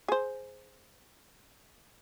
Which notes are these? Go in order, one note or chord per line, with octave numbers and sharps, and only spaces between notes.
G#4 C5